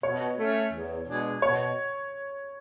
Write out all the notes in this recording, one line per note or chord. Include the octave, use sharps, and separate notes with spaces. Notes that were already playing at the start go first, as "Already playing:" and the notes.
B2 C#5
A3 C#4
E2
B2 G#3 D4 G#4
B2 C#5